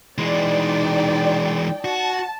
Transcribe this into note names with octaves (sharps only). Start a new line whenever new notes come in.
E3 G#3 D#4 D5 G5
F#4 A5